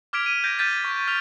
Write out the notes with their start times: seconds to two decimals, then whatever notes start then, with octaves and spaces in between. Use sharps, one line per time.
0.13 D6 F6 G#6 B6 D7 F7
0.26 D#7
0.44 G6 G#6 A#6 D7
0.58 F6 G6 A6 B6 D#7
0.84 C#6
1.08 F6 B6 F7